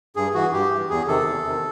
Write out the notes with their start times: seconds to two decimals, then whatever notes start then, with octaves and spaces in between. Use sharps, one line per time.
0.16 G2 G#4
0.34 E3 F#4
0.53 G2 G4
0.72 E3
0.90 E2 G#4
1.08 C3 D#3 A4
1.26 E2
1.44 C3 D#3